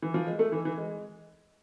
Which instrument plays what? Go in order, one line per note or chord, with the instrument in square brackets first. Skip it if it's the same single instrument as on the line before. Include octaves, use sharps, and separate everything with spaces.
[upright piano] E3
F3
G#3
A3
E3
E3
G#3